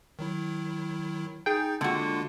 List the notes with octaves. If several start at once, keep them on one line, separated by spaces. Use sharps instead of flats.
D#3 F#3 E4
D#4 G#4 G5 A6
D3 G#3 A#3 F4 F#4